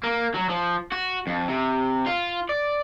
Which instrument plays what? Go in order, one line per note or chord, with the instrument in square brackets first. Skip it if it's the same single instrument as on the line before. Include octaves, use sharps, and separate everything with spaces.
[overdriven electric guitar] A#3
F#3
F3
F#4
F2
C3
F4
D5